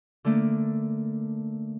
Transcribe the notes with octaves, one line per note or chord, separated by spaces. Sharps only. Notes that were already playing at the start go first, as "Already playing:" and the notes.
D3 A3 A#3